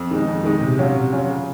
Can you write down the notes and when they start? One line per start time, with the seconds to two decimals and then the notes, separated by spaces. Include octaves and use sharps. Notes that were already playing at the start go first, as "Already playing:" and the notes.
Already playing: F2
0.11 D#3 G#3 D#4
0.28 F2
0.44 D#3 G#3 D#4
0.61 C3
0.78 F#3 C#4 F4
0.95 C3
1.13 F#3 C#4 F4
1.29 C#3